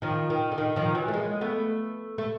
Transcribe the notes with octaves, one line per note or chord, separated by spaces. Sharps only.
D#3 F3
D#3
D3
D#3
D#3 F3
E3 F#3
A3
G#3 A#3
A3 B3
A3